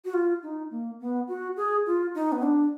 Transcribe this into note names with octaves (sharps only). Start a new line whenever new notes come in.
F#4
F4
D#4
A#3
B3
F#4
G#4
F4
D#4
B3
D4